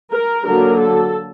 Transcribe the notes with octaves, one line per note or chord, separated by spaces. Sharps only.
A#4
D3 F#3 A#3 A#4
A4